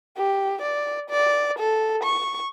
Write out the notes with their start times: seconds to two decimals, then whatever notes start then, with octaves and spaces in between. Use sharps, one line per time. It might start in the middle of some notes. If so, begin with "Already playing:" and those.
0.17 G4
0.62 D5
1.10 D5
1.59 A4
2.04 C#6